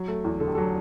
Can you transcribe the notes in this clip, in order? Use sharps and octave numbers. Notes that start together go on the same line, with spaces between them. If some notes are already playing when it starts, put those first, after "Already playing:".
Already playing: F#3
A3
E2
D3 A4
G4
F#3 A4